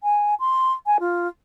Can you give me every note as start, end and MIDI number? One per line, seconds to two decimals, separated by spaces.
0.03 0.35 80
0.40 0.73 84
0.86 0.97 80
1.00 1.28 65